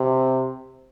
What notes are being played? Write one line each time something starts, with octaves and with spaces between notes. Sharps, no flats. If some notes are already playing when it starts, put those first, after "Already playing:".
Already playing: C3